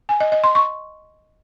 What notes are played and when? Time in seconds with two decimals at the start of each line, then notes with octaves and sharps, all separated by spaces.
0.09 G#5
0.20 D#5
0.32 D#5
0.44 C6
0.55 C#6